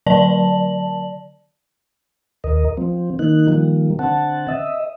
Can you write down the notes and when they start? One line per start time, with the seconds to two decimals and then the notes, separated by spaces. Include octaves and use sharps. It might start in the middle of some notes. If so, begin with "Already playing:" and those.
0.07 D3 F#3 D5 A5 F#7
2.44 D#2 A#4 D#5
2.77 F3 C4
3.19 D#3 A#3 D#4 F#6
3.48 D#3 F3 G3 A#3
3.99 D3 C4 F#5 A5
4.48 D#5 E5